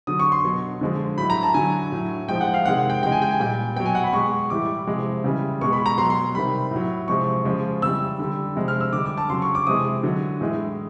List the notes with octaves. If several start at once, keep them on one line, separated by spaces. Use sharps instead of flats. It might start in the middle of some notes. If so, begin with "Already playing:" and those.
D3 F#3 D#6
C#6
C6
B2 F#3
D3 F3 G#3
A2 F#3 B5
A#5
A5
D3 F#3 G#5
A2 F#3
A2 F3 G#3 G5
F#5
F5
C3 D#3 G#3 F#5
F#5
G5
C#3 E3 G#3 G5
G#5
G5
G#5
A#2 G3 G5
B2 F#3 G5
G#5
F#5
B5
B2 G#3 C#6
A2 E3 G3 D6
C3 F3 G#3
C#3 E3 G3
B2 G#3 C#6
B5
A#5
B2 F#3 C6
C6
C3 D#3 G3 B5
A2 F#3
C3 F3 G#3 C#6
C#3 F3 G#3
C#3 E3 G3 E6
D3 G3
C3 F3 G#3
F6
E6
D3 G3 D6
D6
A5
C#3 F#3 C6
C#6
D6
C3 E3 G#3 D#6
D3 F#3
A2 E3 G#3